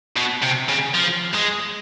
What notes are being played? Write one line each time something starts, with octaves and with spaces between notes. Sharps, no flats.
B2
C3
C#3
F3
G#3